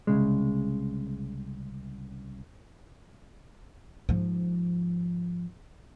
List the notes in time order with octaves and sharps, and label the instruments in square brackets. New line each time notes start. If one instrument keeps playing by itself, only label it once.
[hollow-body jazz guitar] C2 C#3 G#3
[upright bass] G#2 F3